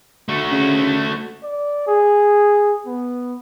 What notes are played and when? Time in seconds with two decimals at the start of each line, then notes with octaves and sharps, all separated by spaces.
0.29 A3 F#4
0.51 C#3
1.43 D5
1.87 G#4
2.86 B3